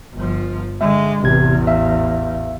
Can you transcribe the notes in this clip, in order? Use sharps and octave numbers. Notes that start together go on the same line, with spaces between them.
G1 F3
D3 G#3 E5
A1 E2 C3 G#6
E5 F5